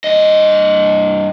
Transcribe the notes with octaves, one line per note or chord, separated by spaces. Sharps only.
G2 D#5